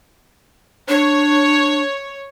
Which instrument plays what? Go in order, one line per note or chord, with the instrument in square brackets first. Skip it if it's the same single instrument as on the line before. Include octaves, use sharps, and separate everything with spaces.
[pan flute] D4 [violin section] C#5